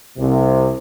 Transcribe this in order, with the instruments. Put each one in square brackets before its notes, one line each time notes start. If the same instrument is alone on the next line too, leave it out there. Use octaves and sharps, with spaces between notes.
[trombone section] C2 C3